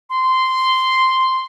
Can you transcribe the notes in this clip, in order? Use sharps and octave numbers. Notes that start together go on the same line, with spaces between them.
C6